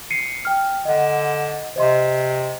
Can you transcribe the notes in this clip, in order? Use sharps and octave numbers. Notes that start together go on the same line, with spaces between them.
C7 C#7 D#7
G5 F6
D3 D#5 F#5
C3 C5 D#5 C6